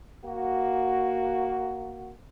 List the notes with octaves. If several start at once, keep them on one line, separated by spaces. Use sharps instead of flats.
A#3 F#4